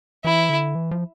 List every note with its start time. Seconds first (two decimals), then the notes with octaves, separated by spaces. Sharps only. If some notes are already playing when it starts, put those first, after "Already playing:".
0.25 E3 E4
0.49 D3
0.75 E3
0.91 F3